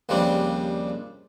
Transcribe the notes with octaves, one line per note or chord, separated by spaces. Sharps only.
D#2 C#3 F3 G3 C4 D4